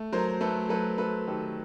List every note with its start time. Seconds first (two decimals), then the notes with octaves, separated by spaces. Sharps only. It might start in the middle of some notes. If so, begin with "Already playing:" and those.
Already playing: A3
0.13 F#3 A#4 C5
0.41 A3 A4 B4
0.69 F#3 A4 B4
0.98 A3 A4 B4
1.27 D#3 G4 A4